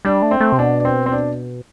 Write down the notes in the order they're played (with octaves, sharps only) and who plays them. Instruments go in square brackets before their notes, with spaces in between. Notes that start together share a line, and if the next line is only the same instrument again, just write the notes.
[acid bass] G3 [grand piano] D4
[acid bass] A3
[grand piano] C4
[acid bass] A3
C3
[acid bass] B2 [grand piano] D4
[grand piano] D4
C4
C4
D4